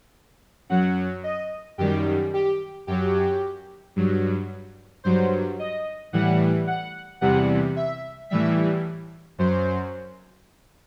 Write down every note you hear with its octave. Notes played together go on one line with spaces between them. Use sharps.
F#2 F#3 F#5
D#5
F#2 D#3 G3 G4
G4
F#2 F#3 G4
G2 F#3
G2 F#3 C5
D#5
A2 E3 G3 F#5
F#5
E2 C3 E3 G3 F#5
E5
A2 E3 G3 E5
F#2 F#3 C5